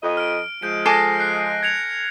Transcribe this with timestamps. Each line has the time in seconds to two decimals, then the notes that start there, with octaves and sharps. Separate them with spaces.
0.03 F2 D#5
0.17 F6 D7
0.63 F3 G#3 G6 D7
0.86 A4 G#5 D6 A#6 C7
1.20 F#6 C7
1.63 G#6 C#7 F7